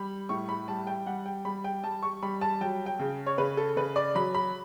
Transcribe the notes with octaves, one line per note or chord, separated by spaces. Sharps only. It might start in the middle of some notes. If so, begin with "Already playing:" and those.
Already playing: G3 B5
A2 C#6
B5
G3 A5
G5
G3 F#5
G5
G3 B5
G5
G3 A5
C#6
G3 B5
A5
F#3 G5
G5
C#3
C#5
C#3 B4
A4
C#3 B4
D5
F#3 B5
B5